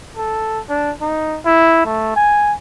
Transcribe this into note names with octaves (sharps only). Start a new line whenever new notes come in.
A4
D4
D#4
E4
A3
G#5